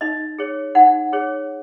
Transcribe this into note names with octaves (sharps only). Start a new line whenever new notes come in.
D#4 D#5
G#4 C#5
D#4 F#5
G#4 C#5